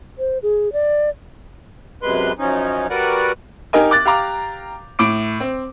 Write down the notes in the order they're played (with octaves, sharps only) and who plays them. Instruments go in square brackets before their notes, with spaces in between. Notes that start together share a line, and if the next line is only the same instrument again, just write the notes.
[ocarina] C5
G#4
D5
[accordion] F#2 C3 G#3 B4 C6
F#2 F3 C#4 D#4
G3 F#4 A#4 B4 D5 F#5
[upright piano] D#4 G4 A#4 D#5 G#5
D6 F#6 A6
G4 F5 A#5 D6
A2 D6 D7
C4